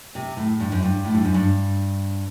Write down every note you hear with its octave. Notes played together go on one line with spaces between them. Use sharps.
C3
A2
G2
F#2
G2
A2
G2
F#2
G2